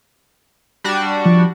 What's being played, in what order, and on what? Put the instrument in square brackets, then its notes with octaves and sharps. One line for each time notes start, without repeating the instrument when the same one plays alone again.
[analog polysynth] G3 D4 F#4
[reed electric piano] F3